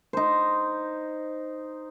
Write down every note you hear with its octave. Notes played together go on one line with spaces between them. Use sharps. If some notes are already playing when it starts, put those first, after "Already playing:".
D#4 C5